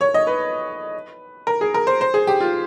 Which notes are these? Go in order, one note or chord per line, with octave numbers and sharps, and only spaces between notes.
C#5
D#5
B4
A#4
G#4
A#4
C5
C5
G#4
G4
F4